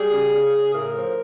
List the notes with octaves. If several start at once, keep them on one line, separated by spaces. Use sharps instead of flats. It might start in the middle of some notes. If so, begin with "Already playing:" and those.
Already playing: G3 G#4
C#3
C#3
C#3
A2 A#4
F3